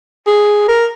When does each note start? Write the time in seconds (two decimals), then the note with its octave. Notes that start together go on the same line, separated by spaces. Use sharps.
0.27 G#4
0.68 A#4